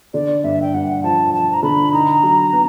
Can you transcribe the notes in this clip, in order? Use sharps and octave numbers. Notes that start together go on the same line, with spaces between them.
D3 D5
G2 E5
G5
G2 F#5
F3 A5
F3 A5
A#5
D3 B5
D#4 A#5
F#3
B3